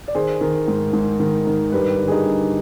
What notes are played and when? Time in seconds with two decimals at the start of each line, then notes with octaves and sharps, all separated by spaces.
0.08 D5
0.15 D#3 G#4 C5
0.41 D#3
0.68 G#2
0.93 G#2
1.20 D#3
1.47 D#3
1.72 G2 G4 B4
1.98 D3
2.08 G#4
2.12 D#4 G4
2.26 G2